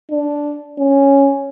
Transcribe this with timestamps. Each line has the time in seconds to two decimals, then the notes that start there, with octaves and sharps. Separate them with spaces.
0.11 D4
0.79 C#4